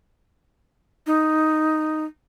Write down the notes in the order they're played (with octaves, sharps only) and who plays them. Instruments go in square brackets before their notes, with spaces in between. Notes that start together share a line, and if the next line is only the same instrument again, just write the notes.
[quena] D#4